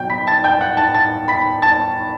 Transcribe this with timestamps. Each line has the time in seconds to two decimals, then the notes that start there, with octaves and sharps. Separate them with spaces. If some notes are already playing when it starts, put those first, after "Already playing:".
Already playing: B2 F#3 G5 G6
0.10 B5 B6
0.27 A5 A6
0.44 G5 G6
0.61 F#5 F#6
0.77 A5 A6
0.94 A5 A6
1.28 B5 B6
1.62 A5 A6